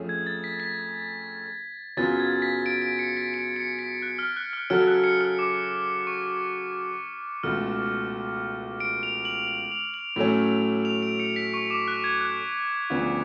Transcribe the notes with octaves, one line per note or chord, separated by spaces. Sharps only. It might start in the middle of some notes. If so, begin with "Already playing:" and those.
Already playing: F2 F3 A3 C#4 G#4
G#6
A6
B6
B6
F#2 C#3 F#3 B3 F4 A6
G#6
B6
D7
D7
C#7
B6
D7
C#7
B6
F#6
F6
F#6
F6
C#3 F#3 C#4 F#4 A4 F6
F#6
C#7
F6
D6
C#6
C#2 B2 A3 F6
D7
F7
F#7
F#7
F7
F#7
A2 F#3 A3 C#4
F7
D7
C#7
B6
C#6
D6
F#6
G#6
F#6
D2 C#3 F3 B3 D4